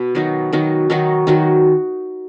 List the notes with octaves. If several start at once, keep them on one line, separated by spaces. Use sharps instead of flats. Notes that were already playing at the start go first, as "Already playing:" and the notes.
Already playing: B2 B4
D#3 F#3 D#4 F#4
D#3 F#3 D#4 F#4
D#3 F#3 D#4 F#4
D#3 F#3 D#4 F#4